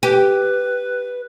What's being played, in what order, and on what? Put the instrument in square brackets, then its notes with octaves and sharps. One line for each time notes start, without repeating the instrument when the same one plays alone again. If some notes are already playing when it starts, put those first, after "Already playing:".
[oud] G4 [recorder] B4